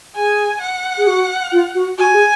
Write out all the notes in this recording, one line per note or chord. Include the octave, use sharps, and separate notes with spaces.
G#4 G#5
F#5
G#4
F#4
F4
F#4
F#4 G#5
G#4